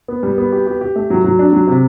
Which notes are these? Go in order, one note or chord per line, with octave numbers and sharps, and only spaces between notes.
B3
G3
B3
G4
G4
G4
A3
F#3
F#3
D4
F#3
C3